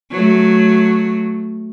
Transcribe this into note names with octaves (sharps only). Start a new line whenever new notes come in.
F#3 A3